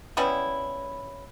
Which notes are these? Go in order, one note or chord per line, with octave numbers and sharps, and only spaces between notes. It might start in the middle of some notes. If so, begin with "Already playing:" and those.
G3 B3 C#4 E4